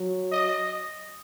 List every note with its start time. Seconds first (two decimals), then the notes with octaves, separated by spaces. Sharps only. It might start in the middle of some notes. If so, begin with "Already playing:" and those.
Already playing: F#3
0.32 D#5